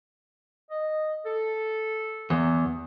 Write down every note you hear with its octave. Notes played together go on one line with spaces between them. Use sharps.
D#5
A4
E2